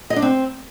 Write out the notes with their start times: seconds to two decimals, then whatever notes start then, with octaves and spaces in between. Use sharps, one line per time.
0.10 D#5
0.16 D4
0.22 C4